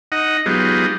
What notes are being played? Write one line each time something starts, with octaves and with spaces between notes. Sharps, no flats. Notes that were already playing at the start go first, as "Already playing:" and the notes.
D#4 D#5 F#5
F#3 G#3 B3 D#4 F4 G4